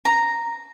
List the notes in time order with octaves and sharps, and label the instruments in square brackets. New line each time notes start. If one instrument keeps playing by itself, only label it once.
[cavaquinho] A#5